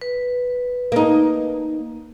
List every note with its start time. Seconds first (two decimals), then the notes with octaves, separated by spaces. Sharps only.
0.01 B4
0.92 A#3 D#4